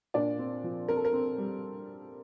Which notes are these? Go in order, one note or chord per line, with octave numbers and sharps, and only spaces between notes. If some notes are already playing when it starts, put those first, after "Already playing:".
A#2 D4 D5
C4
F3
C4 A#4
A4
A#4
C4
G3